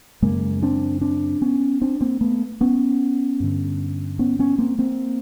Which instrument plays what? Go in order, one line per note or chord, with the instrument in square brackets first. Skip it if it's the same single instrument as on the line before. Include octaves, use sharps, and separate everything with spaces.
[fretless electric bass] F#2 C#3 G#3 A#3
C4 D4
C4 D4
B3 C#4
C4 D4
A#3 C4
A3 B3
B3 C#4
G2 D3
B3 C#4
B3 C#4
A#3 C4
A#3 C4